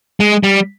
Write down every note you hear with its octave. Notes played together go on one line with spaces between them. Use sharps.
G#3
G3